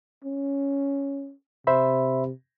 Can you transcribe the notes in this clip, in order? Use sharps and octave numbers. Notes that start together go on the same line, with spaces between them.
C#4
C3 C5 E5 B5